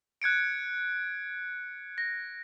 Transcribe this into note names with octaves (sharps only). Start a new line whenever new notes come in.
F#6 G#6 C#7 D7
A#6